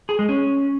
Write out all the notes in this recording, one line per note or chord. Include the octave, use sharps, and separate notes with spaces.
G#4
G#3
C#4